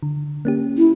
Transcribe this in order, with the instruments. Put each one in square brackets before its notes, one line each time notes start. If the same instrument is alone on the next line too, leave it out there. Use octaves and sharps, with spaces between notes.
[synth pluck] D3
A#3 C#4 G4
[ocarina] E4